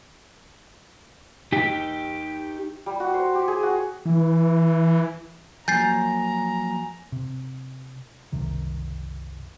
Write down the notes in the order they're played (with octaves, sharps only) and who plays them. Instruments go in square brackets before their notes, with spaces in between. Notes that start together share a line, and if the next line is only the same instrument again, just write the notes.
[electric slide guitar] D#4 G4
[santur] G3
F#4
C5
G4
G#4
F#4
[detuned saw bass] E3
[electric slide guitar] F3 F#3 A#3 [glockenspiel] G#5 [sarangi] A#5 [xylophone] G6 A6 C7
[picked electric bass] C3
F#1 C2 C3 D#3